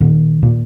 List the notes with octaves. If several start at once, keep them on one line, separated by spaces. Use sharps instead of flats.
A#2 D#3
A#2